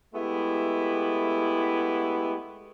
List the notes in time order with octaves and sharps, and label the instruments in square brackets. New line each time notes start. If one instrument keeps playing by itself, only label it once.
[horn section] G#3 A3 B3 E4 G4